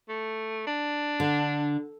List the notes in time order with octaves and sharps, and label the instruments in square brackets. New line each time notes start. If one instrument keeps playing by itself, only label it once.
[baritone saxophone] A3
D4
[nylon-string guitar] D3